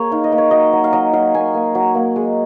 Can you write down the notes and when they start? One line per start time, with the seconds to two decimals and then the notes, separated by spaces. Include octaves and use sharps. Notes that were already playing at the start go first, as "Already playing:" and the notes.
Already playing: A#3 G#4 C#5
0.11 D#4 F5
0.24 D#5
0.32 A#3
0.38 C#5
0.51 F#3 D#5
0.73 F#3
0.84 F5
0.93 F#3 D#5
1.13 F#3 F5
1.34 A#3 G#5
1.54 A#3
1.75 F#3
1.95 A#3
2.16 G#3